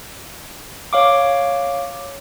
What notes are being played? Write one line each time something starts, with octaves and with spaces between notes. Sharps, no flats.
C#5 F5 D6